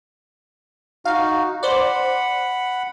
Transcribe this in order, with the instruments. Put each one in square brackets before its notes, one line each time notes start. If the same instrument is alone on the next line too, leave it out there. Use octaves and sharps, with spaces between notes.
[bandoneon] D#4 F#4 [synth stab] F5
[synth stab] C5 D5 [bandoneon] F#5 B5